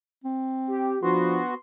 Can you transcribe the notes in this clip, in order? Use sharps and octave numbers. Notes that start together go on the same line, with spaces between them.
C4
G4
F3 B3 D4 F#4 C6